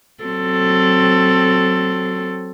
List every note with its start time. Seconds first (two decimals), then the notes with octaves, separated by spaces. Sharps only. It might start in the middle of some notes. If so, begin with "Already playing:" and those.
0.24 F#3 C4 A4